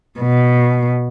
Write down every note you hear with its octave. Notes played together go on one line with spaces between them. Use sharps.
B2